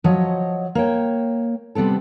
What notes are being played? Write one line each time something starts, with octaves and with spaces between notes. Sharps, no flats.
F3 F#3 C#5 D#5
A#3 C#5 G5
C3 G3 B3 C4 A4